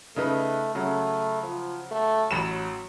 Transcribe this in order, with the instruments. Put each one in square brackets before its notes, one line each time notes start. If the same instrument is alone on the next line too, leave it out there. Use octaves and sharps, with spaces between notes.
[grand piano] C#3 D#4 B4 [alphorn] A3
[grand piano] C#3 F#3 [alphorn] A3
[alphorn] F3
A3
[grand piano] A1 B5 E7 [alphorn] F#3